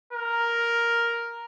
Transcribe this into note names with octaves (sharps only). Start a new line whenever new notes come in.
A#4